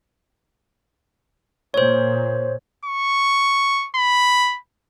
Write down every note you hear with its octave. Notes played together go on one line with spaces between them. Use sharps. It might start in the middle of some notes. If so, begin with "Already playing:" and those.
A#2 C5 C#5
C#6
B5